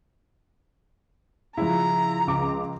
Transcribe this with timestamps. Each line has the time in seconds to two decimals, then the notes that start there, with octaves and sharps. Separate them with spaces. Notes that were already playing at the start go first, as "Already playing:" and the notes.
1.57 C#3 F3 E4 A#5
2.27 C#2 D6